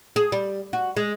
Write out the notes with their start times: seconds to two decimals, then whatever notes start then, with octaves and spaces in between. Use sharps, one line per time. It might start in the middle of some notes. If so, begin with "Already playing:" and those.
0.16 G#4
0.32 G3
0.73 F#4
0.97 G#3